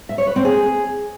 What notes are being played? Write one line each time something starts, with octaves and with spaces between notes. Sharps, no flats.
E5
C#5
B4
C4
G#4